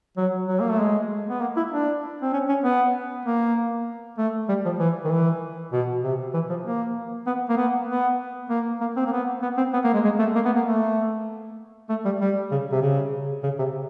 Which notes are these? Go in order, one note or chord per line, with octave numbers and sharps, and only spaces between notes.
F#3
F#3
A#3
A3
G#3
B3
A#3
E4
D4
C4
C#4
C#4
B3
A#3
A3
G3
F3
E3
D#3
E3
B2
C3
E3
F3
A#3
B3
A#3
B3
B3
A#3
A#3
C4
A#3
B3
B3
C4
B3
A#3
G#3
G#3
A3
A#3
B3
A#3
A3
A3
G3
G3
C#3
C3
C#3
C#3
C3